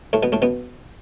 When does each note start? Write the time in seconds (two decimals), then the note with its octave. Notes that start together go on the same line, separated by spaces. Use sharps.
0.13 A2 A3
0.23 B2 B3
0.32 A2 A3
0.42 B2 B3